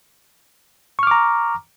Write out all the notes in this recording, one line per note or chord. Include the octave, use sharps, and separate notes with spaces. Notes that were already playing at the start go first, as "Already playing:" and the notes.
A#5 C#6 D6 F6